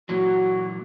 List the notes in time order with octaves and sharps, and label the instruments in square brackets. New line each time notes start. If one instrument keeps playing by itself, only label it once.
[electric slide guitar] A#2 E3 F#3 [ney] F#4